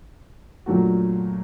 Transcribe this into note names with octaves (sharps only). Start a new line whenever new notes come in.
A#2 F#3 A3 D4 F#4